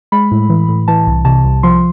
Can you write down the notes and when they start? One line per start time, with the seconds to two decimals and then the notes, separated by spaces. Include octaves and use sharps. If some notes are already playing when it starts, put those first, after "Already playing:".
0.12 G#3 B5
0.31 A2
0.50 E3
0.69 A2
0.88 E3 A5
1.07 C2
1.25 C3 A5
1.44 C2
1.63 F3 C6